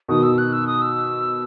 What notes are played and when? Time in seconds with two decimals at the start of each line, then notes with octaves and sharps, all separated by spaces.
0.09 B2 D#3 D#6
0.23 E6
0.38 F#6
0.53 E6
0.67 D#6
0.82 E6